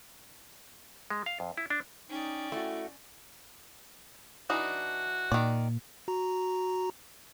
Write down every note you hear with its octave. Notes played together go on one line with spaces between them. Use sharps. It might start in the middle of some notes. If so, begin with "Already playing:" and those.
G#3
F5
F2
E4
D4
C#4 D#4 D5 G5
A3 E4 F#4
E3 D4 D#4 F#4
A#2 D#3 D5
F#4 A#5